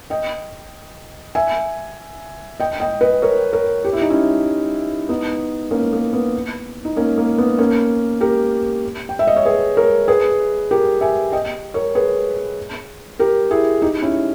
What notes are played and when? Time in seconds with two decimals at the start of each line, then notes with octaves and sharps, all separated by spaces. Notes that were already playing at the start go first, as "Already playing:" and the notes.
0.10 D#5 G5
1.35 E5 G#5
2.60 D#5 G5
2.80 D#5 G5
3.01 B4 D#5
3.22 A#4 C#5
3.53 A#4 C#5
3.85 G4
3.93 E4
4.02 D#4
4.10 C#4 E4
5.09 B3 D#4
5.71 A#3 C#4
5.93 A#3
6.13 B3
6.85 D#4
6.97 A#3 C#4
7.18 A#3
7.38 B3
7.58 A#3 C#4
8.21 G4 A#4
9.09 G5
9.19 E5
9.27 D#5
9.36 C#5
9.45 G#4 B4
9.77 A#4 C#5
10.08 G#4 B4
10.71 G4 A#4
11.01 E5 G#5
11.32 D#5 G5
11.74 A#4 C#5
11.95 G#4 B4
13.19 G4 A#4
13.51 E4 G#4
13.82 D#4 G4
14.02 C#4 E4